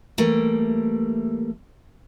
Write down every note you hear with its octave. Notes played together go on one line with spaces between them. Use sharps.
E3 G3 A3 A#3